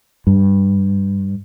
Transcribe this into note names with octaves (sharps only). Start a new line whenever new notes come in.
G2